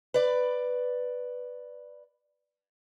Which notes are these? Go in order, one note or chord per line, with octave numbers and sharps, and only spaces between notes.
B4 D5